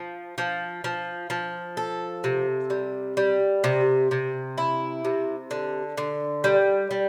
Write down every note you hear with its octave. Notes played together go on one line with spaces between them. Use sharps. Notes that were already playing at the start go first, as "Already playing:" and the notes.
Already playing: F3
F3
F3
F3
A4
C3
G3
G3
C3
C3
E4
C3
D3
D3
G3
G3